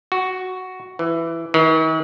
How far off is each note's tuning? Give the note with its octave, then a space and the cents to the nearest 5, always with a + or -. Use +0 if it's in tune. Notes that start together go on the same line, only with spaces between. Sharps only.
F#4 +5
E3 +10
D#3 +45